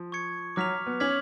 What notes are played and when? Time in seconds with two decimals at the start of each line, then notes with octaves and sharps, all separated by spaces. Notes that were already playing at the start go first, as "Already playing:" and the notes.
Already playing: F3
0.12 C#6 G#6 C#7
0.56 F#3 D6 F6 B6 F7
0.87 B3
1.00 C#4 D6 F6 G#6 B6 F#7